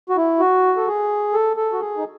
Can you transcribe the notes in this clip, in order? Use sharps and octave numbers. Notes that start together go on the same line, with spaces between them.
F#4
E4
F#4
A4
G#4
A4
A4
F#4
G#4
D#4